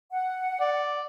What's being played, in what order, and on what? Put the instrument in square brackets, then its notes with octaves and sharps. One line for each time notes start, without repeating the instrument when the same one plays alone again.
[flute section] F#5
[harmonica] D5